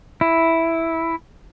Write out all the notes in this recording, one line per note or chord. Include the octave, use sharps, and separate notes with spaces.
E4